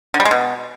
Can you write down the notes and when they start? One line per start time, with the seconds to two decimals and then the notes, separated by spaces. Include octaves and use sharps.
0.14 D3
0.20 G3
0.25 G#3
0.31 B2